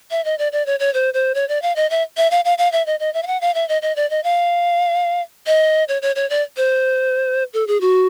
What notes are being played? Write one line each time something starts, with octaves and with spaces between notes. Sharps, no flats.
E5
D#5
D5
D5
C#5
C#5
C5
C5
C#5
D5
F5
D#5
E5
E5
F5
F5
F5
E5
D#5
D#5
E5
F5
F#5
F5
E5
D#5
D#5
D5
D#5
F5
D#5
C#5
C#5
C#5
D5
C5
A4
G#4
F#4